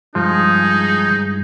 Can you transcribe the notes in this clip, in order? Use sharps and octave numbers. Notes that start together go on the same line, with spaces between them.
G2 F3 G#3 D#4 G#4